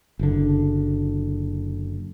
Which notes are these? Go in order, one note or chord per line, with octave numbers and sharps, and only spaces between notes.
F#1 D3